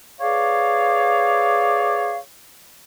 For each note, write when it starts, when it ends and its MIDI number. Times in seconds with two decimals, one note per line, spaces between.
0.20 2.17 68
0.20 2.17 71
0.20 2.17 73
0.20 2.17 74
0.20 2.17 77